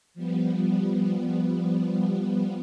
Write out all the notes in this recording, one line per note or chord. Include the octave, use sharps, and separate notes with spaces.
F3 G3 B3